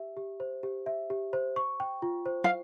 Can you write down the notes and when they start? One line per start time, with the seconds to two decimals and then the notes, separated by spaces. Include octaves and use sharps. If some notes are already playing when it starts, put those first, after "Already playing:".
Already playing: G4 E5
0.17 G4
0.40 C5
0.63 G4
0.86 E5
1.10 G4
1.33 C5
1.56 C#6
1.80 G5
2.02 F4
2.26 C5
2.44 F5